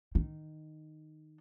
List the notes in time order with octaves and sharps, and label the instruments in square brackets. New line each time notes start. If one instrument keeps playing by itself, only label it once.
[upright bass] D#3